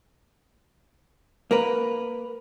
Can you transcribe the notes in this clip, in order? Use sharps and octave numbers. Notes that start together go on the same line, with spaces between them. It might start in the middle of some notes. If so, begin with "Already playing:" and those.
A#3 A#4 B4